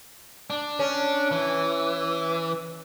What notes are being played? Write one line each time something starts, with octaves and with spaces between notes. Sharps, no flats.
D4
C#4
E3